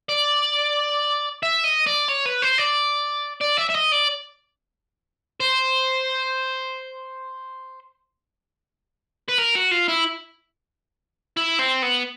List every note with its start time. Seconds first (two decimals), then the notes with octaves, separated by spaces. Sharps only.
0.09 D5
1.43 E5
1.64 D#5
1.87 D5
2.09 C#5
2.26 B4
2.42 C5
2.58 D5
3.41 D5
3.58 E5
3.69 E5
3.74 D#5
3.92 D5
5.40 C5
9.29 B4
9.39 A#4
9.55 F#4
9.71 F4
9.88 E4
11.37 E4
11.59 C4
11.82 B3